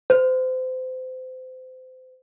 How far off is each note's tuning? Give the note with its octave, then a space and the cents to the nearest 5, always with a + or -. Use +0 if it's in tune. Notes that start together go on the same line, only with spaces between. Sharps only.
C5 -30